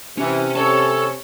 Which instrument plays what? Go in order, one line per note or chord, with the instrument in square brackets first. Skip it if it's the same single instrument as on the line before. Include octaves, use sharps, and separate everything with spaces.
[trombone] C3 [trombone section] E3 [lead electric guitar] C#4
[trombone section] C#4 [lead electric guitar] A4 A5 [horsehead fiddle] C#5